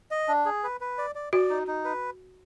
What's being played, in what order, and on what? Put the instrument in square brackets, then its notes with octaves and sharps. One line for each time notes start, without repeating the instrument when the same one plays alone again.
[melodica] D#5
D4
G#4
B4
B4
D5
D5
[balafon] F#4 [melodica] D5
[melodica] D#4
D#4
B4